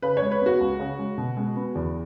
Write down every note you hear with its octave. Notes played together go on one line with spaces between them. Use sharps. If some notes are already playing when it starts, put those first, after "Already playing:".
C#3 B4
C#5
G#3
B4
B3 F#4
C#2
C#3
G#3
B2
G#3
B3
E2